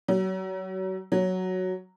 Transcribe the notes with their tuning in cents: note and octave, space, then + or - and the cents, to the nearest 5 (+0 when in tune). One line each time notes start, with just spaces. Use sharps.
F#3 +30
F#3 +0